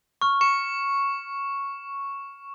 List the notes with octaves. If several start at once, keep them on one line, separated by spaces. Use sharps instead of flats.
C#6 F6
C#6 C#7